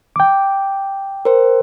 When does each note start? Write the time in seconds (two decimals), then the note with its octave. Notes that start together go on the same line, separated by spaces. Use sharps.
0.16 G5 D6
1.25 A#4 C5